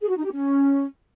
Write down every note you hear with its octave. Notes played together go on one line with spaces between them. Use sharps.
G#4
F#4
D#4
G4
C#4